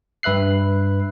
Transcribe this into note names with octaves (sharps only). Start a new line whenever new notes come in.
G2 B4 E5 F#6 C7